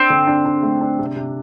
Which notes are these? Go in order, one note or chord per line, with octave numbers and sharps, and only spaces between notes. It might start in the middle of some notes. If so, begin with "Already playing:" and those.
Already playing: C4 D4
D3
D4
D4
A3
D4
C3
C3